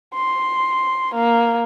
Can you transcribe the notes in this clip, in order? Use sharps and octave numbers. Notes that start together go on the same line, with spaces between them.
C6
A#3